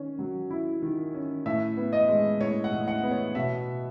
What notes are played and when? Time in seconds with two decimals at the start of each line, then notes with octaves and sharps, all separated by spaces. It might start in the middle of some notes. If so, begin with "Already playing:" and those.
Already playing: D#3 C#4
0.19 F#3
0.50 E4
0.82 D#3
1.14 C#4
1.45 A2 E5
1.77 B3
1.93 D#5
2.08 G#3
2.40 A2 C#5
2.64 F#5
2.72 A2
2.88 F#5
3.03 B3
3.11 C#5
3.35 B2 E5